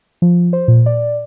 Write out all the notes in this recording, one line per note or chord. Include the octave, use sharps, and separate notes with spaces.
F3
C5
A#2
D5